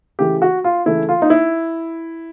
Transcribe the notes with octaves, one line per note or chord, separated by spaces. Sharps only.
C#3 E3 A3 G4
F#4
F4
C#3 E3 A3 E4
F4
D#4
E4